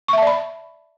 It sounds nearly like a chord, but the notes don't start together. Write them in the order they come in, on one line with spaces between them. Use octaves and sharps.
C#6 E5 A5 D5 B5